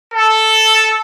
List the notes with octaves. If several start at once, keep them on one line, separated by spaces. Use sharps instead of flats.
A4